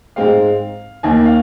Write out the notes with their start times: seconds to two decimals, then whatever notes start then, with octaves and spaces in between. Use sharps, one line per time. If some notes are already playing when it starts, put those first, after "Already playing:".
0.16 G#2 G#3 C4 F5
1.03 D#2 D#3 A#3 G#5
1.25 F5